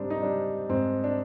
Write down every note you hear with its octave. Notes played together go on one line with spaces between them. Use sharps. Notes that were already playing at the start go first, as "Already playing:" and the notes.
Already playing: G#2 G3 C4 D4
D#4
G3 D4
G#2 C4
D4